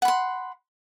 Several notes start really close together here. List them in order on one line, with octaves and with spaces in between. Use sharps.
F#5 B5 C6